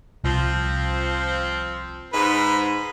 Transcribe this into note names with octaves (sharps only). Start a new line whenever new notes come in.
C2 F3 C4
G#2 B4